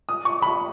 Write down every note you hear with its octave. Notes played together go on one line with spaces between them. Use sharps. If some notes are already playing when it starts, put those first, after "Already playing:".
D#6
C#6
B5